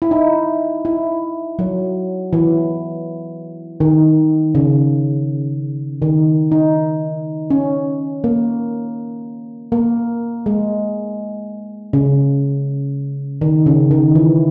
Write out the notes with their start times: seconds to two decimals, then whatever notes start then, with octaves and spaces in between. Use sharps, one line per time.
0.02 E4
0.11 D#4
0.85 E4
1.59 F#3
2.33 E3
3.80 D#3
4.55 C#3
6.02 D#3
6.52 D#4
7.50 C#4
8.24 A#3
9.72 A#3
10.46 G#3
11.93 C#3
13.41 D#3
13.66 C#3
13.91 D#3
14.15 E3